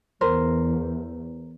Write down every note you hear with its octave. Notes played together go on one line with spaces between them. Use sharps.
E2 A#4 C5